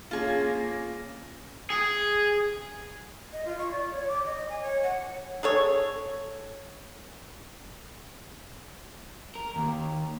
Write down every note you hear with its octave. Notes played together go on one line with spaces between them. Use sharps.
A#3 C#4 F4 G#4
G#4
D#5
F4
C#6
D5
C#5
D6
D#5
G#5
C#5
F#5
G#4 A4 C#5
A#4
D#2